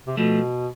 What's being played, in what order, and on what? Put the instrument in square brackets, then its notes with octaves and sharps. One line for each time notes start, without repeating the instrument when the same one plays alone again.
[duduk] C3
[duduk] B2 [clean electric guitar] F3 A3